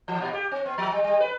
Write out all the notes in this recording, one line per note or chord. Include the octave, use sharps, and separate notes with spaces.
E3
A#2
G4
C4
B3
F3
G3
G3
B4